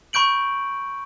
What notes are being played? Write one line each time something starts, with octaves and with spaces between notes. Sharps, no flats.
B5 C#6 G6 D7 F#7